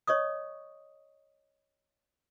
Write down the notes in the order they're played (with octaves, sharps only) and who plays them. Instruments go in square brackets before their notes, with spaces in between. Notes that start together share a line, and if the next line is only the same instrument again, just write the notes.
[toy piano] C#5 D#5 C#6 D#6